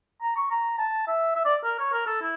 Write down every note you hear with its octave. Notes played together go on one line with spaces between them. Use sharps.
A#5
C#6
A#5
A5
E5
E5
D5
A#4
C#5
A#4
A4
E4